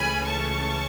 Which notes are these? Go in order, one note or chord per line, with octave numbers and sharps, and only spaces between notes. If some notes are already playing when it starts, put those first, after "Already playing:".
Already playing: C#2 C#3 E3 A3 C#4 G#5 B5
A5 C#6